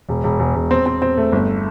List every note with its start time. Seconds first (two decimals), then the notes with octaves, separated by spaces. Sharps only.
0.09 E1
0.24 E1
0.39 E1
0.55 E1
0.71 C4
0.86 C4
1.02 C4
1.17 A3
1.32 G1